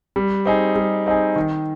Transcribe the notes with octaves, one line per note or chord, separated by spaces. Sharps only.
G3
C4 D#4 G#4
G3
C4 D#4 G#4
D#3